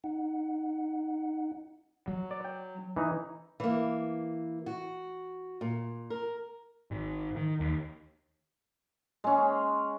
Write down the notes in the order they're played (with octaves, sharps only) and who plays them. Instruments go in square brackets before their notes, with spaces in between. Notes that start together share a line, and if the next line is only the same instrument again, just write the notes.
[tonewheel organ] D#4 F#5
[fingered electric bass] F#3
[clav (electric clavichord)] D5
G5
E3 D#4
[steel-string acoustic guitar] E3 A#3
F#4
A#2
A#4
[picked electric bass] G#1
D#3
D#2
[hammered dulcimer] G#3 C#4